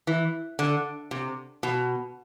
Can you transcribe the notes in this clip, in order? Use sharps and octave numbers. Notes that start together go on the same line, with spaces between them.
E3
D3
C3
B2